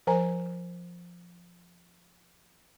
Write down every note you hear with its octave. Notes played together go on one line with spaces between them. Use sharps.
F3 A#4 C5 G#5 A#5